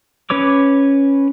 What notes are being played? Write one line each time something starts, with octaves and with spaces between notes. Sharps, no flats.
C#4 B4 C#5 D6